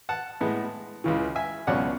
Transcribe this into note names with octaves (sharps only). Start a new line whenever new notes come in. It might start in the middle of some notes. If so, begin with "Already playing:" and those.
F#5 A5
A2 G#3 B3
C#2 C#3 E3
E5 G#5
C#2 B2 F#3 C#4 D5 F#5